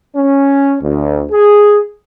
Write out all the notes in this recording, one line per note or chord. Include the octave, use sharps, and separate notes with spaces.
C#4
D2
G#4